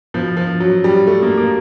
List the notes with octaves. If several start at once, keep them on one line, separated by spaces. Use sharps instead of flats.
B2 F3
F3
F#3
G3
A3
A#3
A#3